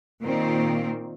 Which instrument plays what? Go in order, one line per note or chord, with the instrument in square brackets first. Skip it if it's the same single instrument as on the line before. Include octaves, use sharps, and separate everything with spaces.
[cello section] A#2 D#3 A#3 C4 F4